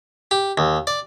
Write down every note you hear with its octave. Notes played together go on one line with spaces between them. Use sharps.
G4
D#2
D5